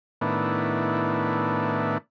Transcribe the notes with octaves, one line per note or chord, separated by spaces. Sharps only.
A2 D#3 B3 D4 E4